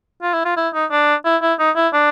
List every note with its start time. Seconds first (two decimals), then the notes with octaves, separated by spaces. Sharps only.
0.23 F4
0.34 E4
0.45 F4
0.57 E4
0.74 D#4
0.91 D4
1.25 E4
1.42 E4
1.59 D#4
1.76 E4
1.94 D4